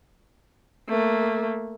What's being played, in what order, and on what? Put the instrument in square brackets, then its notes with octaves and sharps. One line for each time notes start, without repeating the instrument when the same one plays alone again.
[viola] A3 A#3